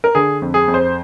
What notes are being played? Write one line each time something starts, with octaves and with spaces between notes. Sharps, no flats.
A#4
D3 G#4
F2
G#4
F2
C5